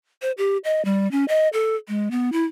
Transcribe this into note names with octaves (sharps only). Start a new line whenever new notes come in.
C5
G4
D#5
G3
C#4
D#5
A4
G#3
B3
E4